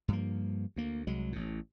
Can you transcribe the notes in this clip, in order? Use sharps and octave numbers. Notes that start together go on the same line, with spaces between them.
G2 F3 A#3
D2 A#3
C2 F#3 G#3
A1 A2